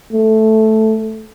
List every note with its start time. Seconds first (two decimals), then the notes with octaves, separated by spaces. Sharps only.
0.13 A3